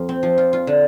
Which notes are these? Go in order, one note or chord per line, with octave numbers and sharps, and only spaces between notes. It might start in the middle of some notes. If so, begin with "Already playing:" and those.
Already playing: F2 F4
C4
F3
F4
F4
D3